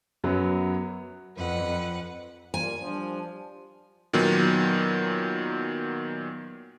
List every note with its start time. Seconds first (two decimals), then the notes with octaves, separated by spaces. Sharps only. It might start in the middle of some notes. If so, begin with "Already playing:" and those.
0.24 F#2 F#3 B3
1.37 F2 B4 F#5
2.54 G3 A#3 F4 G#5
2.82 F3 G3 D4
4.13 A#2 D#3 F#3 B3